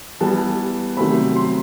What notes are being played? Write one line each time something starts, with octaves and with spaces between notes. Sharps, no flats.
E3 G3 B3 A5
C3 D#3 F#3 A3 C4 B5
C6